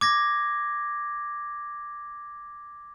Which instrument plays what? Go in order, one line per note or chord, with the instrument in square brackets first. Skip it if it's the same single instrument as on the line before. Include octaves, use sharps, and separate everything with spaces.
[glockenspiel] D6 G#6 A#6